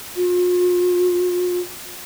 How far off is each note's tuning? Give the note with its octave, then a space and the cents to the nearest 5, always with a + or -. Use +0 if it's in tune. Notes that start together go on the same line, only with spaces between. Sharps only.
F4 +40